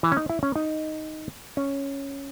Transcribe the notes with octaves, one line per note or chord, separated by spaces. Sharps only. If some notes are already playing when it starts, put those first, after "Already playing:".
E3
C#4
D#4
E4
C#4
D#4
C#4